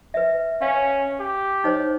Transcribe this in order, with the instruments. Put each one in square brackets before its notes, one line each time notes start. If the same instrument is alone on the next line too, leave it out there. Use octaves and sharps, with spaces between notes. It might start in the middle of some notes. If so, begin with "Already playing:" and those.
[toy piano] B4 E5
[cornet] C#4 [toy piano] F5
[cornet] G4
[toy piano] D#4 C5 C#5